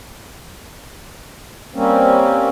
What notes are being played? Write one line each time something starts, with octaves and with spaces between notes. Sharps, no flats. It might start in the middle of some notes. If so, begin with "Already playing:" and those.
G3 A#3 C4 C#4